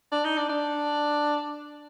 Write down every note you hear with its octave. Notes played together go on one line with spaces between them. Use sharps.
D4
D#4
D4
D4